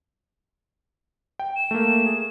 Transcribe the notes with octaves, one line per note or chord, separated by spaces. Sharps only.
G5
E7
A3 A#3
G#4